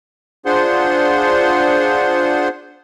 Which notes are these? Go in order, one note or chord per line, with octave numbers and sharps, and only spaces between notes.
D4 F4 G#4 C5 F#5 C6